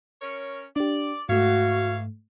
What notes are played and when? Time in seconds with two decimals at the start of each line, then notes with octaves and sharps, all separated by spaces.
0.22 C#4 A#4 C#5
0.76 D4 G4 D5
1.29 G#2 E3 A3 F#4 C#5 F5